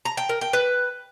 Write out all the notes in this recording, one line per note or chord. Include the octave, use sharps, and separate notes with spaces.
A#5
G5
A#4
G5
B4